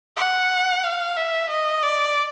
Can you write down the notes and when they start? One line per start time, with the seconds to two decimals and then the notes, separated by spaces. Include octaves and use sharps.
0.17 F#5
0.83 F5
1.17 E5
1.50 D#5
1.83 D5